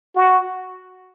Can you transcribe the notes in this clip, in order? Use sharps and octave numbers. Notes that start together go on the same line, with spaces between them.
F#4